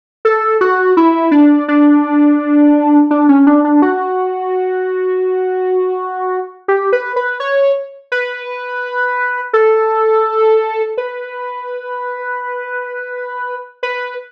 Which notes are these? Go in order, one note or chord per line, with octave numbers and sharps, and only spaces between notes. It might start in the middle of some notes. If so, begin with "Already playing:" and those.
A4
F#4
E4
D4
D4
D4
C#4
D4
D4
F#4
G4
B4
B4
C#5
B4
A4
B4
B4